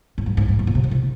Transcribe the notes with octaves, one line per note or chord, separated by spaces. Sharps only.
G#2
G2
G#2
G2
G#2
A#2
C3
A#2
C3